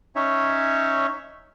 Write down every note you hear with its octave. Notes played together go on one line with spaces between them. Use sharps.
C#4 D#4 C#5 E5